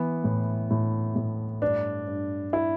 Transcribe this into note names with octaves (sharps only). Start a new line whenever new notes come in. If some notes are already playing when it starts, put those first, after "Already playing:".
Already playing: E3 B3
A2
A2
A2
G2 D4
G2
E4